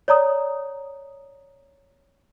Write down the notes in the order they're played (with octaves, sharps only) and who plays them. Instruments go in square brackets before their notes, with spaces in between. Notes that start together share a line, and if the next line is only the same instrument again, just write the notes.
[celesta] C#5 D5 A#5 D#6